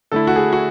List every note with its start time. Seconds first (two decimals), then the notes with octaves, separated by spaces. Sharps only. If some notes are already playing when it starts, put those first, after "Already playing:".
0.12 D3 A3 E4 A4
0.27 F#4
0.36 G#4
0.53 F#4